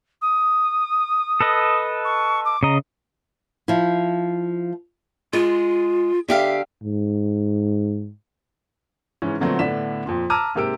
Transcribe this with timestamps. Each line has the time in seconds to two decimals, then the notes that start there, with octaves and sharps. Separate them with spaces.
0.22 D#6
1.41 A4 B4 D#5
2.05 C#6
2.45 D6
2.63 C#3 D#5 A#5
3.68 F3 E4
5.33 G#3 F4
6.28 D3 G4 E5 F5
6.83 G#2
9.22 G#2 C#3 E3 C#4
9.40 A#2 D3 F#3 A3 B3 C4
9.59 A2 D3 B3 D4 B6 E7
10.06 F2 A#2
10.30 A5 A#5 D6 E6 F6 D#7
10.55 G#2 C3 A#3 G4 E6 D7